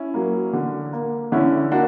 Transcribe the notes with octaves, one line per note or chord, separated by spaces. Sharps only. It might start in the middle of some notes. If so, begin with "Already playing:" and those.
Already playing: C#4 E4
F#3 A#3
D3
A#3
D3 C#4 E4
A#3 D4 F#4